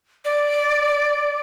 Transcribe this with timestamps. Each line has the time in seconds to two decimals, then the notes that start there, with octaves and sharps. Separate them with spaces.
0.25 D5